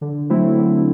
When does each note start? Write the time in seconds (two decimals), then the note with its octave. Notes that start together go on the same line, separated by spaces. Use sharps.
0.01 D3
0.29 F#3 A3 C4 E4
0.58 D3